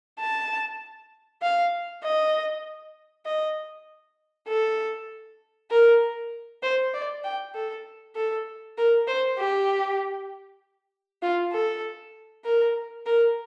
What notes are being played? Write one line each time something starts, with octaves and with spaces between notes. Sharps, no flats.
A5
F5
D#5
D#5
A4
A#4
C5
D5
G5
A4
A4
A#4
C5
G4
F4
A4
A#4
A#4